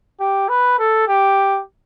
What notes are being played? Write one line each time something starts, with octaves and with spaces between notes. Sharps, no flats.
G4
B4
A4
G4